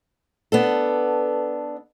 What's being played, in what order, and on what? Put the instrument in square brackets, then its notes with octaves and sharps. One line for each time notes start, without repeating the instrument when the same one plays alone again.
[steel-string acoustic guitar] B3 D4 A4